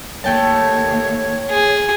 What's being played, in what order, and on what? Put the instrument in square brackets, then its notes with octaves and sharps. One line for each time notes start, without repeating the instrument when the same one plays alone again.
[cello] D#2 [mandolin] A3 G5 A5 [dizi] C#5
[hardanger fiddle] G#4